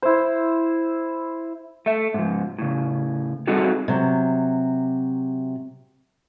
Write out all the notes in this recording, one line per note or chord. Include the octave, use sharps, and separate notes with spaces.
E4 C5
A3 E5
G#2 F3
A2 C#3
G3 C4 D#4 F#4 G#4 A4
C3 F#3